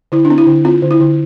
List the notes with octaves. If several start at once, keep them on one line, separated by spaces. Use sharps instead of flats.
D3 E4
D4
C4
E4
D3
C4 F4
D3
E4
D3